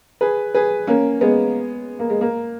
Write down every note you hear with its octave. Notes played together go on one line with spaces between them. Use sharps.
G#4 B4
G#4 B4
A#3 C#4
G#3 B3
A#3
G#3
A#3